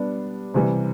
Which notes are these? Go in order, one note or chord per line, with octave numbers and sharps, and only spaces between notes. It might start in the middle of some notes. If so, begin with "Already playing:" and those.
Already playing: G3 B3 D4
C3 E3 G3